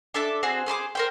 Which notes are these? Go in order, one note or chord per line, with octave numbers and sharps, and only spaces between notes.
D4 A4 E5 D6
C4 F#4 G#4 C5
G#4 C5 B5 D6
A#4 C5 G5